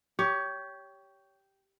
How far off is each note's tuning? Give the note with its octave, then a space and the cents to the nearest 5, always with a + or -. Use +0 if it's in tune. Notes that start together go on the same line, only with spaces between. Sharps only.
G4 -5 C#5 +20